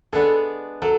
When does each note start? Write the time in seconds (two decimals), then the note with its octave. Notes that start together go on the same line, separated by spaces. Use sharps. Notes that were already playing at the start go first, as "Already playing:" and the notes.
0.12 G#3 B3 D4 G#4 A4
0.82 F#3 A4